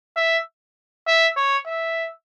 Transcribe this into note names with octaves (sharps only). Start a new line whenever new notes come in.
E5
E5
C#5
E5